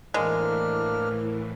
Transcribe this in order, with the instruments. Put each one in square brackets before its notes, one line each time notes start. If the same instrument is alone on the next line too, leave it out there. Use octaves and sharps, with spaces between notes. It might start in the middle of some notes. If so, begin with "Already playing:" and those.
[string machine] A2 E3 [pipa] G#3 [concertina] A#3 D4 F6 [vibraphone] A#4 C5